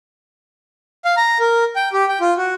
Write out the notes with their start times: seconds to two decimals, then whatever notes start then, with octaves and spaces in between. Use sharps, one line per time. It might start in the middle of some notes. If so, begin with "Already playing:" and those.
1.05 F5
1.17 A#5
1.40 A#4
1.76 G5
1.93 G4
2.09 G5
2.21 F4
2.38 F#4